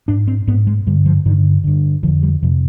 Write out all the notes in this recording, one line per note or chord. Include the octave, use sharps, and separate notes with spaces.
G#2 D4
C4
G#2 B3
G#3
G2 D3 G3
F3
G2 D3 D#3
G2 D3
F2 D3 F3
G3
F2 C3 F3